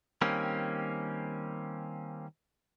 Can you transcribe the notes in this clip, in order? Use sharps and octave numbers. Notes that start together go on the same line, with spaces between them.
D#3 G3 A#3 C4 C#4